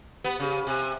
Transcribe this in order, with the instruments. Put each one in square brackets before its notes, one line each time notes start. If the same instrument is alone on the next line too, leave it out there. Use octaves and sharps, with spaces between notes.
[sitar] B3 [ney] G4
[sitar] C#3 [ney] G4
[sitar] C3 [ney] G#5